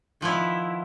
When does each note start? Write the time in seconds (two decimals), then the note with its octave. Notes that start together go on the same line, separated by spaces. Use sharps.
0.21 D#3 F3 B3 E4